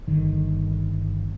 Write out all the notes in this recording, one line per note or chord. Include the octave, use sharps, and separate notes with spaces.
G1 D3 D#3